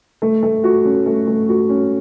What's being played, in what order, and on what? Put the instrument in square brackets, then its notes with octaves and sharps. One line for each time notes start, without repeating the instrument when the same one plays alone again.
[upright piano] A3
A3
F#4
C#4
A3
A3
F#4
C#4